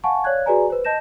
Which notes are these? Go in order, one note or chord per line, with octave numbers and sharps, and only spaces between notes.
F5 F#5 G#5 A5 C#6
C#5 D5 F5 F#6 G#6
F#4 G#4 B4 D5 G#5 A#5
B4 C5
D#5 A5 G6 A#6 E7